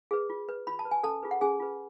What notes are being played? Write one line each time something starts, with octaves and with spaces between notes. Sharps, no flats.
G#4 B4
F4
B4
F4 B5
A5
B4
G#5
C#4 A4 A5
F4 G#4 B4
F#5
C#4 G#4 G#5
F4 G#4 B4